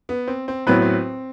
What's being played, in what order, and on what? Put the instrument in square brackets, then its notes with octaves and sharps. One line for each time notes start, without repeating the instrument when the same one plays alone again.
[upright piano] B3
C4
C4
[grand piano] A2 F#3 B3 E4 B4 [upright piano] C4
[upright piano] C4